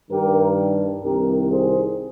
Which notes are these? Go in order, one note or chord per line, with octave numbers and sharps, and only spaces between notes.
G2 D#3 G4 A#4
C2 C3 D#3 G4 A#4
G#4 C5